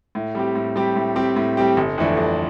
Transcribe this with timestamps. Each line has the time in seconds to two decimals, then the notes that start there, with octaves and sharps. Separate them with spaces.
0.15 A2
0.35 G3 C4 G4
0.55 A2
0.76 G3 C4 G4
0.96 A2
1.16 G3 C4 G4
1.36 A2
1.57 G3 C4 G4
1.77 G1
1.98 F2 E3 A3 D4
2.17 G1